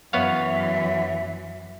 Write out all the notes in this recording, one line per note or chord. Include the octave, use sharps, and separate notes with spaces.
F#2 E3 B3 C#5 E5 F5